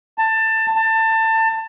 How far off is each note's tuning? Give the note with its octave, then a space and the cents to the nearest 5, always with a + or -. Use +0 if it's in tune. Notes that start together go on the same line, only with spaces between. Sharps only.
A5 +20
A5 +25